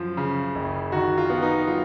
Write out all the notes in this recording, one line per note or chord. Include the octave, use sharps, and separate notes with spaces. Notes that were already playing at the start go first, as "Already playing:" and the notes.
Already playing: F#2 F3
C#3
F#1
D#3 F#4
F4
B3
D#4
F#3 F4